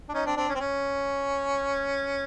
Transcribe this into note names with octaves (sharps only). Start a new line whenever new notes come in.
D4
C#4 D#4
C4 D4
C4 D4
C#4
C4
C#4